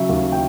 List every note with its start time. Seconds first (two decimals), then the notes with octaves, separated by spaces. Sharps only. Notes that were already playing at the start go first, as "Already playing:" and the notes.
Already playing: C#3 F#3 E5
0.09 D#2
0.32 G5